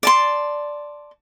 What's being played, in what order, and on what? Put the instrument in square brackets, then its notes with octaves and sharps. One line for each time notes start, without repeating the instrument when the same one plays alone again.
[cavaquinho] D5 A5 C6